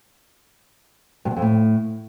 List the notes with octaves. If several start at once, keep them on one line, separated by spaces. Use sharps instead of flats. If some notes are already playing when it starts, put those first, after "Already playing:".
G2
E2
F2
A2